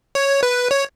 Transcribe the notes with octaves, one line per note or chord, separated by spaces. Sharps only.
C#5
B4
C#5